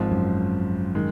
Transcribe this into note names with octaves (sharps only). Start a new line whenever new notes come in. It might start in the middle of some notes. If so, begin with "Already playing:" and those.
Already playing: G#1 G#2 F3 G#3 C4
F#2
D#3 G#3